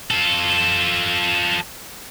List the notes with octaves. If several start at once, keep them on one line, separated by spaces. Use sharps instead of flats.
F4 A4